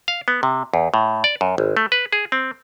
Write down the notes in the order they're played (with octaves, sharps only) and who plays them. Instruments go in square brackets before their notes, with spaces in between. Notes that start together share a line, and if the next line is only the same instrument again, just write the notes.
[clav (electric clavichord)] F5
B3
C3
E2
A2
D5
F#2
G#1
A3
B4
G#4
C4